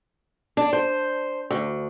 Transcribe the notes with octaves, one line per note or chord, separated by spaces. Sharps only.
D4
C5
D2